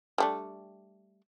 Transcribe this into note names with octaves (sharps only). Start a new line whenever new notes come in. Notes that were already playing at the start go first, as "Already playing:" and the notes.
G3 A3 D4